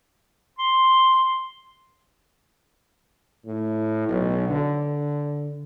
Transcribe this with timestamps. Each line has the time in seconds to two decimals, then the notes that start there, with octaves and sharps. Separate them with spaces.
0.59 C6
3.45 A2
4.09 B1
4.49 D3